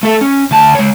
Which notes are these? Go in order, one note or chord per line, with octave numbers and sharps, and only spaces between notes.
A3 A4
C#4
D2 A5
G#3 C#5